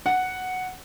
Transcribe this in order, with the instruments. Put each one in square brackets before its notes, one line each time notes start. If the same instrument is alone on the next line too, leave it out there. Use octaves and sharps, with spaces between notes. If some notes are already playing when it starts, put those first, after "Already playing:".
[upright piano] F#5